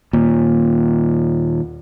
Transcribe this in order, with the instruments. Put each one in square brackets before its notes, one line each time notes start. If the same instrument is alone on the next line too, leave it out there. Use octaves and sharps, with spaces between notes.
[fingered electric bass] D#2 A#2